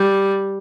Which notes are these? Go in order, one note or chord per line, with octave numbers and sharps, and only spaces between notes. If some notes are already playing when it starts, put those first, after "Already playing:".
Already playing: G3